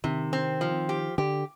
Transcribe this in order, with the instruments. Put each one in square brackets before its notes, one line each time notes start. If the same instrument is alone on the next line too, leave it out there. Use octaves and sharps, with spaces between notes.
[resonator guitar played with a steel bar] C3 [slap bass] D#3
[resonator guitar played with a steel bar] C4
F3
G4
[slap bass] D3 [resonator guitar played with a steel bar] G4